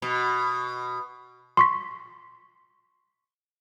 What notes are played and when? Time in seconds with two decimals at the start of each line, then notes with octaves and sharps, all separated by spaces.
0.02 B2
1.57 C6 C#6 B6